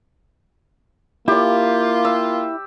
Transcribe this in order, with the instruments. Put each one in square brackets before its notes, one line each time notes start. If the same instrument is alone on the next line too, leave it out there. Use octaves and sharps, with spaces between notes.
[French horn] A#3 [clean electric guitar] E4 [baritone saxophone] F4 [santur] G4 D5
[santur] E6